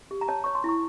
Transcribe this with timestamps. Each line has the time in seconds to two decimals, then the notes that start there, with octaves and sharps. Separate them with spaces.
0.11 G4
0.21 A#5
0.28 C#5 A5
0.44 C#5 C#6
0.55 C6
0.64 E4 C#6